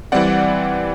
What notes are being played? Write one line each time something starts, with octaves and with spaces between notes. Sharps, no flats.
E3 G3 C4 D5 F#5